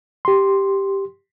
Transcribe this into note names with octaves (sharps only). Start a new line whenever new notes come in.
G4 C6